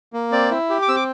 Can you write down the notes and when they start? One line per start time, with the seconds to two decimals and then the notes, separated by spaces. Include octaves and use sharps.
0.13 A#3
0.32 C4 D5
0.51 E4
0.70 G4
0.82 D6
0.88 C4 E6
0.96 D6